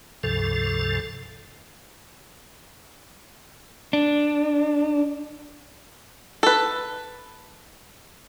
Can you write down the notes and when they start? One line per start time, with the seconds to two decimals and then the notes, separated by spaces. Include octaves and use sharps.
0.23 C#2 G2 C3 F3 A4
3.93 D4
6.43 A4 B4